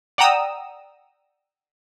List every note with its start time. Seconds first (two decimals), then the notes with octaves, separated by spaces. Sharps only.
0.18 D5 F#5 G5 A#5 D#6 E6